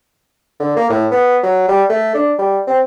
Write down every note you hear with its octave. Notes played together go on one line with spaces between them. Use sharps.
D3
A#3
A2
B3
F#3
G3
A3
D4
G3
C4